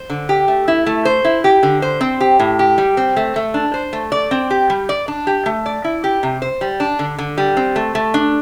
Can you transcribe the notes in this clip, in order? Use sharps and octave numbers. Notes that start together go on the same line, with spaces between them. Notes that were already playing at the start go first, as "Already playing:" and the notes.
Already playing: C5
D3
G4
A3
E4
A3
C5
E4
G4
D3
C5
C4
G4
A2
G4
G3
C4
A3
A3
D4
C5
A3
D5
C4
G4
G3
D5
D4
G4
A3
D5
E4
G4
C3
C5
G3
D4
D3
D3
G3
C4
A3
A3
D4